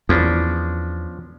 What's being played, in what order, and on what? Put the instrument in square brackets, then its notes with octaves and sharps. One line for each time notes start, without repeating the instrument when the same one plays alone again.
[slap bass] E2 [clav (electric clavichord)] F3 C#4 D4